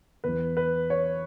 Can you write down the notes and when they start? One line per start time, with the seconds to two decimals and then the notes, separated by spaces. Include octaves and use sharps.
0.24 E2 E3 B4
0.57 B4
0.90 C#5